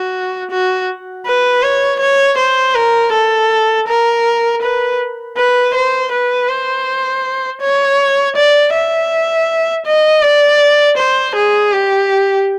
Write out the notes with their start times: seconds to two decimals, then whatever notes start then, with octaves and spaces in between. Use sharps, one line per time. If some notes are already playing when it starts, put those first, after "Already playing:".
Already playing: F#4
0.51 F#4
1.26 B4
1.63 C#5
2.00 C#5
2.38 C5
2.75 A#4
3.12 A4
3.88 A#4
4.62 B4
5.37 B4
5.74 C5
6.12 B4
6.49 C5
7.62 C#5
8.36 D5
8.74 E5
9.86 D#5
10.22 D5
10.97 C5
11.35 G#4
11.72 G4